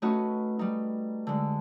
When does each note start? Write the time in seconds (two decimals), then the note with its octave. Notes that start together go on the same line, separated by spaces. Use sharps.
0.02 A3 C#4 D#4 F#4 B4
0.59 G3 D#4
1.27 D3 G#3